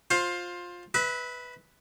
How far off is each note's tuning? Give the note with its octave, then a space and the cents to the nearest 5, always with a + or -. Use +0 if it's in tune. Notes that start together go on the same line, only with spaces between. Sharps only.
F4 +15 C5 +15
B4 +0 E5 -35